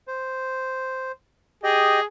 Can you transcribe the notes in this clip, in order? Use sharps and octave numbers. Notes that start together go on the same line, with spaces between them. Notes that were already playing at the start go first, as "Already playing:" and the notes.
C5
G4 G#4 D#5